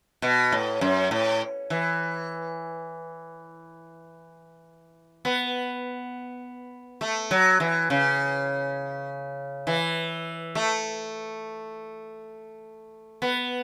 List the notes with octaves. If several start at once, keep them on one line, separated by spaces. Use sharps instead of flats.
B2
A2
F#2
A2
E3
B3
A3
F#3
E3
C#3
E3
A3
B3